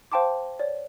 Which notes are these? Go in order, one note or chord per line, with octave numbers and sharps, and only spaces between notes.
C5 F5 G5 A5 C6 D6
C#5 D5